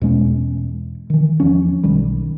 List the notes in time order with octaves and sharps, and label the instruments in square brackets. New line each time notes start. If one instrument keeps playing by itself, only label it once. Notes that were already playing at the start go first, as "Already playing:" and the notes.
[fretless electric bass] E2 B2 G#3 C#4
D#3 E3
E2 F3 C#4
B1 D#3 G3